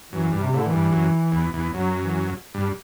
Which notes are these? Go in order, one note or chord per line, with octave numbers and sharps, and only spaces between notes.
F#2 E3
G2
C3
A2 D3
E3
G2
F#2
E2
E2
F#2 F#3
E3
G2